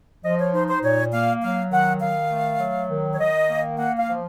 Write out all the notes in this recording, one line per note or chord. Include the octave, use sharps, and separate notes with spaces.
F3 D#5
C#5
D#4 C5
C5
A#2 C#5
A#3 F5
F#3 F5
D#3 F#5
D#3 F5
A3
F#3
D#3
C#5
D#3 D#5
A#3
A#3 F#5
F5
F3